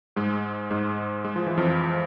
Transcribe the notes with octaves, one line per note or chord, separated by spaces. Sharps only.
G#2 G#3
G#2 G#3
G#3
F3
E3
F2 F3